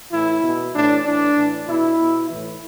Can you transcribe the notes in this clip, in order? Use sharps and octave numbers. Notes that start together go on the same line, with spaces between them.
A2 E3 E4
B2
A2 E3 D4
A2 E3 D4
A2 E3
B2 E4
B2
A2 E3